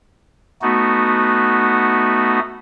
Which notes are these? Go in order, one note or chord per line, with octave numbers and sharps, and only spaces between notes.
A3 B3 D#4 F#4